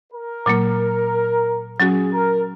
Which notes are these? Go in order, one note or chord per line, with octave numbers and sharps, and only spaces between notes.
A#4
A#2 F#3 A#3
F#3 C#4 F#4 G#4
A#4